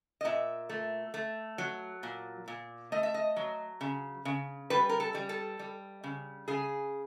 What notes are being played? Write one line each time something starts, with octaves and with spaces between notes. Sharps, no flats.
D#5
A#2 E5
A3
A3
F#3
A#2
A#2
A3 D#5
E5
D#5
F#3
C#3
C#3
G3 B4
A#4
A4
G3
A4
G3
C#3
C#3 G#4